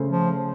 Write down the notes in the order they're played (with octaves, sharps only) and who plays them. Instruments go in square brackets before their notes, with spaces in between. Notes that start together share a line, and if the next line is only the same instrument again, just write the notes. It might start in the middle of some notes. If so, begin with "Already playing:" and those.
Already playing: [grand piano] C#3 A3 C#4 A4 C5
[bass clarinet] F3